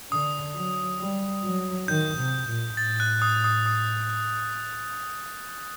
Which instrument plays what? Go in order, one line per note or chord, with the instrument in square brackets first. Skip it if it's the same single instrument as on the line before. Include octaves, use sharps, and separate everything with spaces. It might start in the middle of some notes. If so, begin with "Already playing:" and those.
[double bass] D3 [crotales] D#6
[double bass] F#3
G3
F#3
[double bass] D#3 [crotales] G6
[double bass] C3
A#2
[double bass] A2 [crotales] A6
[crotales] F#6
D#6
D#6
D#6